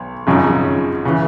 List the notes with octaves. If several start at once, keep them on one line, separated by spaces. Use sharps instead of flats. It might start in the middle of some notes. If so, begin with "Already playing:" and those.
Already playing: B1
G#1 F#2 C#3 F3
C#3 E3